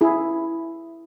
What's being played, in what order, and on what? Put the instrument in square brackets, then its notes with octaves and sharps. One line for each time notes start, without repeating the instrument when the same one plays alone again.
[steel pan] E4 G#4